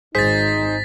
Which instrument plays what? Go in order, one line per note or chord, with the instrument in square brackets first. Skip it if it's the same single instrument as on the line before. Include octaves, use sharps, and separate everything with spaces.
[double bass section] G#1 [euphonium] D#4 [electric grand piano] G#4 C5 [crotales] A6 B6